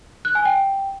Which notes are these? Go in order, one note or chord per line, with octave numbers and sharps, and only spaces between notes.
F#6
G#5
G5